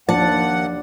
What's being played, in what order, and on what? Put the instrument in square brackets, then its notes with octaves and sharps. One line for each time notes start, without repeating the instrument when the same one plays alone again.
[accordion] D#2 F#5 [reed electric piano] F3 [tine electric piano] D4 D5 [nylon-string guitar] A5